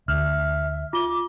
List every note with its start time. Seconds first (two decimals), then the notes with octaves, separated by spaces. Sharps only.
0.08 D2 E5 F6
0.93 F4 D6 G7